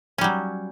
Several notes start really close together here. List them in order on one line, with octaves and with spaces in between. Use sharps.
C#4 G3 F#3